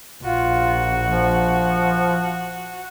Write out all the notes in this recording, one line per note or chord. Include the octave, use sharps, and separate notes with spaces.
A#1 F4 F#4
F3